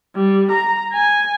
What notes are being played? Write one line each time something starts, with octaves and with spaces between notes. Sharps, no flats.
G3
A#5
G#5